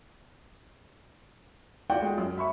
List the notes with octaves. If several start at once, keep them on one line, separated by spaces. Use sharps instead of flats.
F4 F#4 D5 F#5 G5
G#3
F#2
E5 B5 C#6